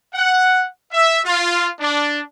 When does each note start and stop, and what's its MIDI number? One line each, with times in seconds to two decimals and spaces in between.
0.14 0.65 78
0.92 1.19 76
1.25 1.69 65
1.80 2.21 62